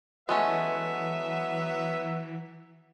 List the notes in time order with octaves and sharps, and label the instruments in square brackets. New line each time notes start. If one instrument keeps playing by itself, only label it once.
[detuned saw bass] E3 [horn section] F#3 B3 E5 [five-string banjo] G#3 A3 C#4